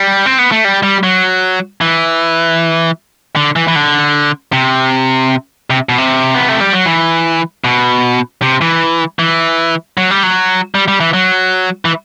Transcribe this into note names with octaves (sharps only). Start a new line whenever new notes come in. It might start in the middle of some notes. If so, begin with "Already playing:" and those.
Already playing: G3
C4
B3
A3
G3
G3
F#3
E3
D3
E3
E3
D3
C3
C3
B2
C3
B3
A3
G3
F#3
E3
B2
C3
E3
E3
F#3
G3
F#3
G3
G3
E3
F#3
E3